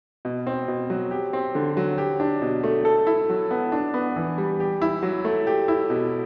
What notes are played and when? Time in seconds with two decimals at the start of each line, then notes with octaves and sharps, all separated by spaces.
0.25 B2
0.47 C4
0.68 B2
0.90 F#3
1.11 G4
1.33 C4
1.55 D3
1.77 F#3
1.98 G4
2.20 D4
2.42 B2
2.63 A3
2.85 A4
3.07 E4
3.30 F#3
3.51 B3
3.72 D4
3.94 B3
4.16 E3
4.38 G3
4.60 G4
4.82 E4
5.03 F#3
5.25 A3
5.47 G4
5.68 E4
5.90 B2